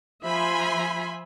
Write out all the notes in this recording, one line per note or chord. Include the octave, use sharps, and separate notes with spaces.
F3 E5 G#5 B5 C6